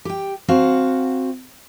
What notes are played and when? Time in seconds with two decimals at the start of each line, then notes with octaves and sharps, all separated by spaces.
0.05 G4 G5
0.48 C4 F#4 F5 F#5 A5